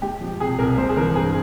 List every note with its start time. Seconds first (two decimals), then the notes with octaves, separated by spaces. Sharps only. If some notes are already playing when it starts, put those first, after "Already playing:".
0.02 G#3 G4
0.21 F3
0.40 C3 G#4
0.59 C2 A#4
0.78 G#3 C5
0.89 G#4
0.97 E3 A#4
1.16 G2 G#4